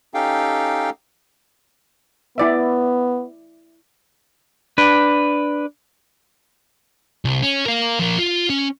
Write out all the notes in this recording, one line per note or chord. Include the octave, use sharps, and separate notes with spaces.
C#4 D#4 G4 A4 F5 G5
B3 E4 D5 E5
D4 B4
C2
C#4
A#4 F5
F3 A#4
F4
C#4